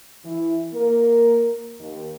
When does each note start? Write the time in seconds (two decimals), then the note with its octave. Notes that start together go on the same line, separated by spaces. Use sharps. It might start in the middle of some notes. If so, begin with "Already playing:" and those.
0.25 E3 E4
0.73 A#3 A#4
1.80 D#2